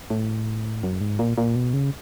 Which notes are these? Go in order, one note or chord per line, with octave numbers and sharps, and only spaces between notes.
A2
F#2
G#2
A#2
A#2
B2
C#3